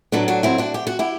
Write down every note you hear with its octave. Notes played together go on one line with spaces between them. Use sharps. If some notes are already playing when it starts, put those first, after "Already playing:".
A2 F#3 B3 D4
D4 F#4
C4 E4
D4 F#4
G4
F#4
E4 G4